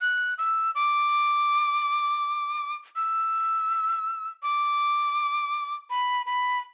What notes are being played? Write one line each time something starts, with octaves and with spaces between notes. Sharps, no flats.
F#6
E6
D6
E6
D6
B5
B5